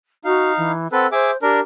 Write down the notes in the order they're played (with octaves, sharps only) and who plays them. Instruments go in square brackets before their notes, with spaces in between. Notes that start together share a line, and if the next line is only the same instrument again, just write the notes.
[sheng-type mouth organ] D#4 F5 [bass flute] F#4
[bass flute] E3
[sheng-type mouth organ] C4 A4 B4 [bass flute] F#5
[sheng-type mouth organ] G#4 E5 D6 [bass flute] C5
[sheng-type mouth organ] D4 A#4 [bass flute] G4